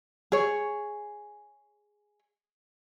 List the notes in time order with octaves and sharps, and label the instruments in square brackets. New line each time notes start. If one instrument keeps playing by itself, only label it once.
[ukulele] G#4 C#5